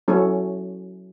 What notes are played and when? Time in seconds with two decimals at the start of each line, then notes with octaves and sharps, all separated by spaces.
0.08 F#3 C#4 E4 A4 C#5